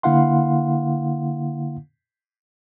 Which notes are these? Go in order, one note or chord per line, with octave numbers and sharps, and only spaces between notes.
D3 A#3 E4 F5 F#5 C6